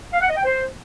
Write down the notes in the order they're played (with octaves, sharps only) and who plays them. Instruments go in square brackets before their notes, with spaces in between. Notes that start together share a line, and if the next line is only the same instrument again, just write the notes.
[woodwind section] F5
F#5
D#5
G5
C5